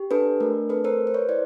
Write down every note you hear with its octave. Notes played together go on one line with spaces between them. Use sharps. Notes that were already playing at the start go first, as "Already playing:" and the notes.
Already playing: G4
D4 A4 B4
A3 A#4
C4 A4 B4
A#4 C5
G#4
C5
B4 C#5
E4 C5 D5